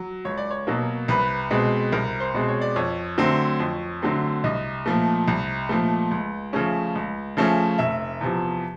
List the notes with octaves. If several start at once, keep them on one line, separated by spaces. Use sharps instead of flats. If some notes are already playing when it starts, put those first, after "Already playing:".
Already playing: F#3
C#2 C#5
D5
C#5
B2 F#3 A#3
C2 B4
B2 G#3 C4
C2 A#4
C5
B2 G#3 C4
C#5
D5
F2 C#5
D3 F#3 A3 C4
F2
D3 F#3 A3 C4
C2 D#5
A#2 F3 A3
C2
A#2 F3 A3
C#2
C#3 F3 A3 C#4
C#2
C#3 F3 A3 C#4
F1 E5
E2 C3 F3